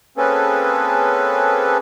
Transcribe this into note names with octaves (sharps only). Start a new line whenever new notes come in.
A#3 C4 C#4 G#4 A4 B4